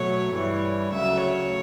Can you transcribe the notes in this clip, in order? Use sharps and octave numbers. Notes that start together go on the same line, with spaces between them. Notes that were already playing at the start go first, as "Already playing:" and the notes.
Already playing: B2 F#3 A3 C#5
G2 E3 G3 C#5
D2 C#3 F#3 A3 E5
C#5